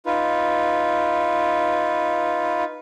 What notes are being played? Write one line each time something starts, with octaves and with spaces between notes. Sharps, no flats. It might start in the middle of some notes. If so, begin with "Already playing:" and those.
D#4 F4 B4